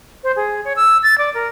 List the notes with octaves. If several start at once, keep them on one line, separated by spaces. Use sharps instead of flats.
C5
G#4
C#5
E6
A6
D5
A#4